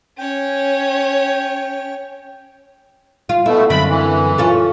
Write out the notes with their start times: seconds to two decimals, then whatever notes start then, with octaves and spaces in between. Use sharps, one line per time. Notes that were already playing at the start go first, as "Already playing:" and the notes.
0.18 C#4 C#5 G5
3.29 F4
3.46 B2 A3 E4
3.70 F#2 D3 C4 B5
3.89 E3
4.38 C#4 F4 A4